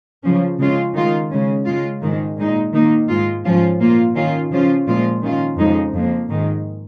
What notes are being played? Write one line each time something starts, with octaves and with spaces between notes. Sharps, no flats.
C#3 F3 C#4
C#3 G#3 C#4 F4
D#3 G#3 F4
C#3 G#3 C#4
C#3 G#3 F4
G#2 D#3 G#3
A#2 G#3 D#4
D#3 A#3 D#4
G#2 G#3 F4
G#2 F3 C#4 F4
A#2 A#3 F4
D#3 C#4 F4
C#3 F3 C#4 F4
A#2 F3 G#3 F4
D#3 C#4 F4
F2 C#3 F3 G#3 D#4
F2 F3 A#3
G#2 D#3 G#3